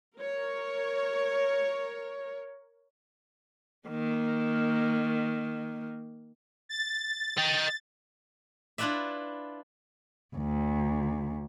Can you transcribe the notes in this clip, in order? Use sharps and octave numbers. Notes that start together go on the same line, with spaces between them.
A#4 C#5
D#3 A#3
A6
D#5 G5
D4 E4 F4 B4 D5 E5
D2